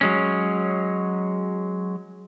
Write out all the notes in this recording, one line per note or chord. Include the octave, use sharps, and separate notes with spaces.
F#3 G#3 C#4